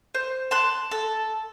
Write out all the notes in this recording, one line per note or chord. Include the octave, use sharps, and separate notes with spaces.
C5
A5 C6 F#6
A4